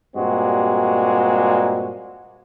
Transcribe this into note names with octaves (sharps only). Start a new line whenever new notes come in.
G2 A#2 G#3 C4 F#4 G4